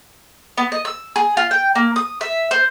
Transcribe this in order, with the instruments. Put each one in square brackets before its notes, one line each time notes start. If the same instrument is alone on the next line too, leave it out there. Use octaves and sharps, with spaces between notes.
[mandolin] B3
D#5
E6
G#4
F4
G5
A#3
D#6
E5
C5